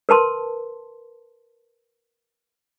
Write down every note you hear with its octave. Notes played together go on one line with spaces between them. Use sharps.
A#4 B4 A5 C6